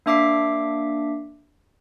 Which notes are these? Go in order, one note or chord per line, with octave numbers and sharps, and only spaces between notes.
A#3 D4 E5 D6 B6 C7